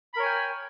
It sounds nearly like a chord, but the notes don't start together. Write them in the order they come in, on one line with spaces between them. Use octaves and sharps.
B5 A#4 C#5 G#5 G5